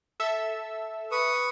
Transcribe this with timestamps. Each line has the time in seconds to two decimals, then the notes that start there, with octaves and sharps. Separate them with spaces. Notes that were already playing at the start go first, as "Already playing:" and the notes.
0.20 A4 E5 E6
1.12 B4 C#6 D#6